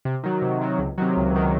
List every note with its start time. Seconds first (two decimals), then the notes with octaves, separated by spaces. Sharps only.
0.05 C3
0.23 D#3 F#3
0.42 C3
0.61 D#3 F#3
0.79 C#2
0.98 C3 D#3 F#3
1.17 C#2
1.34 C3 D#3 F#3